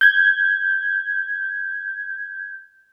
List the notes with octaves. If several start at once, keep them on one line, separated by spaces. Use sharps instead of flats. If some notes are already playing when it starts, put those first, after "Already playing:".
G6 G#6